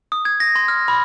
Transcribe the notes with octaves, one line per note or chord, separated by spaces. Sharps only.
D#6
G#6
A#6
C6
F6
B5